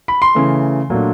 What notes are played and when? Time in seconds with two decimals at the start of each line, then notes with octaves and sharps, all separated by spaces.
0.08 B5
0.22 C6
0.35 C#3 E3 A3
0.90 A#2 F#3 A3 D4